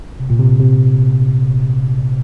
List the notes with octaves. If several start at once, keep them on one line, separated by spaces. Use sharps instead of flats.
C3
A#2
C3
C3